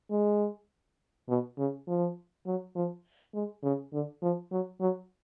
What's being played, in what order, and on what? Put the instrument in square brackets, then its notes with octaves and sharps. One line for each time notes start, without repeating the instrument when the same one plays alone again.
[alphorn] G#3
B2
C#3
F3
F#3
F3
G#3
C#3
D3
F3
F#3
F#3